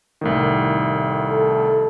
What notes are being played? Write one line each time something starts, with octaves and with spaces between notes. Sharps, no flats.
C2 A2 D#3
A4